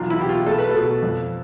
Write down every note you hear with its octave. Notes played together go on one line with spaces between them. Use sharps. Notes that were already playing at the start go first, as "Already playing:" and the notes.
Already playing: B1 E2 F4
E4
B2 G4
F4
A3 A4
B4
B2 A4
F2